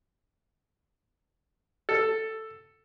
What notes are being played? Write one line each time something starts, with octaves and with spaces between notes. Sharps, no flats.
A4